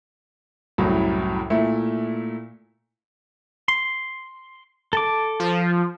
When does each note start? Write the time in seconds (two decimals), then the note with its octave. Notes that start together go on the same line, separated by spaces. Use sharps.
0.78 C2 F#2 A2 F#3
1.50 A#2 A3 E4
3.68 C6
4.93 A4 A5 D6
5.40 F3